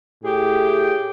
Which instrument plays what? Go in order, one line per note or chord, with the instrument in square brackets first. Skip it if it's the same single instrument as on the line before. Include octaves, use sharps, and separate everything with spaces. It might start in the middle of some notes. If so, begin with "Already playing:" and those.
[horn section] A2 G4 G#4 G5